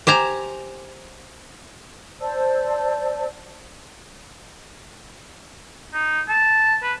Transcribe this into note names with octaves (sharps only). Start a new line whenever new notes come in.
G4 C5 G#5 A#5
C5 D5 A5 E6
D#4
A5
B4